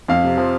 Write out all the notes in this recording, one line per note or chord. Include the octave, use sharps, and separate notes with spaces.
F2 F5
C3
F3